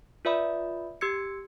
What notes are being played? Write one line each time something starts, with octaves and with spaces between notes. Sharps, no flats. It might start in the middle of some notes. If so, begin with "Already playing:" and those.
F4 B4 D5 E5 B5 D#6
G4 E6 G#6 C#7